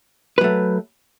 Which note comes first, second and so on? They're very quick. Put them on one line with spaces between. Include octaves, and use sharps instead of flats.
B4 F#3 A3